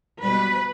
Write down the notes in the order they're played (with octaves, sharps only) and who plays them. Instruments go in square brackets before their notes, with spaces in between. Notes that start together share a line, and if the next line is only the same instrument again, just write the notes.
[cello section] B2 G3 B4